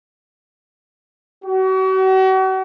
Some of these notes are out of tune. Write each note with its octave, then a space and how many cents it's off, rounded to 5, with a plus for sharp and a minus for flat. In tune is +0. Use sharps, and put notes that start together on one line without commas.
F#4 +40